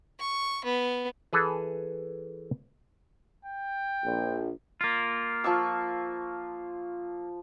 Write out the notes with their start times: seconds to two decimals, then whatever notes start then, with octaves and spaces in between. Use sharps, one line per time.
0.20 C#6
0.64 B3
1.33 E3 G#4 A4 B4
3.45 G5
4.03 A#1
4.81 A#3 F4
5.44 F3 C#6 E6